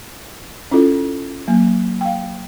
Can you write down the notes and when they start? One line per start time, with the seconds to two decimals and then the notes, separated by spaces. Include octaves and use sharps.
0.71 C#4 E4 F4 A4
1.48 F#3 A#3
2.01 F5 G5